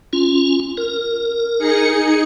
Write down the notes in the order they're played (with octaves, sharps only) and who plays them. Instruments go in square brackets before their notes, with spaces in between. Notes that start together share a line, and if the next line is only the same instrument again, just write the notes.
[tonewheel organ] C#4 F4
A#4
[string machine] D#4 G#4 C#7